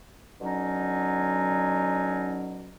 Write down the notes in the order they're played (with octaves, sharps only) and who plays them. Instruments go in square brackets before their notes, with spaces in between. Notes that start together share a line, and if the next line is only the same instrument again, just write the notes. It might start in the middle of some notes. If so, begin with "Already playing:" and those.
[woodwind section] B2 D3 F#3 C#4 D#4